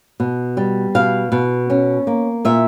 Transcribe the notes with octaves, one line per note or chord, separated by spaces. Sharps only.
B2
G3
B2 F5
B2
C#4
A#3
A#2 E5